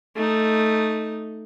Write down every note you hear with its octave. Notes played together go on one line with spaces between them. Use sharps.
A3 D#4